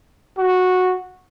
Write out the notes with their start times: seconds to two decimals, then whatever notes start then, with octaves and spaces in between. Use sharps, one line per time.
0.38 F#4